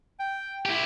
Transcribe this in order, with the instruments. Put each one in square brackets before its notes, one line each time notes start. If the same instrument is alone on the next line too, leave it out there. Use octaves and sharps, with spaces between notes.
[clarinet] G5
[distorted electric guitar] E4 G4